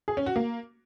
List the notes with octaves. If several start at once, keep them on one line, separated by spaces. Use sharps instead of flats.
G#4
C#4
F#4
A#3